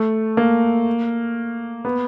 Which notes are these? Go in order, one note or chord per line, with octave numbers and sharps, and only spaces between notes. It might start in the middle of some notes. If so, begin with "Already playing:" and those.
Already playing: A3
A#3
B3